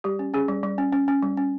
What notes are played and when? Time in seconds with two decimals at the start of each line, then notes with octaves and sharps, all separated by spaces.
0.04 G3 G4
0.19 C#4
0.34 C#4 G#4
0.48 G3
0.63 G3
0.78 C#4
0.93 C#4
1.08 C#4
1.23 G3
1.37 C#4